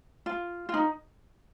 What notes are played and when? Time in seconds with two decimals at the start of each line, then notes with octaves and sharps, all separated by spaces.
0.26 F4
0.69 F4
0.74 D#4